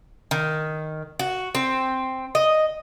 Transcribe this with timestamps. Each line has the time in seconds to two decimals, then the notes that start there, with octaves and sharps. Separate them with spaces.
0.31 D#3
1.19 F#4
1.55 C4
2.35 D#5